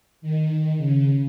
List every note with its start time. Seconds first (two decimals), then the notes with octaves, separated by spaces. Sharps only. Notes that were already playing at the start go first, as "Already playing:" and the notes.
0.22 D#3
0.78 C#3